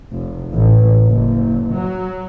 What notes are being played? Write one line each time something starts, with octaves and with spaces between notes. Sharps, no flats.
F1
A1
F#1
F#3